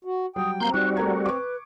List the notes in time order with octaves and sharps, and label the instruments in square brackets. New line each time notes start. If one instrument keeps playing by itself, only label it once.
[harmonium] F#4
[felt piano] F#3 G3 [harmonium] G5 [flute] D#6
[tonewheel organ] A#3 C6 G6 [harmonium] C4 [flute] A#5
[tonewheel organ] G3 F#4 [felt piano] D#4 [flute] F#6
[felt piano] A3 A#4 G#6 [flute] A#5
[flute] B4 [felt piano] C#6 D6